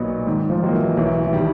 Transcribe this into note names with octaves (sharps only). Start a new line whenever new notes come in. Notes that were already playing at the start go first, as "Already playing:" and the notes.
Already playing: B1 A#2 F#3 B3 D#4
G#2 D#3
F3
D#3 F#3 A#3
E3
B1 E3
E3
B2 D#3 G3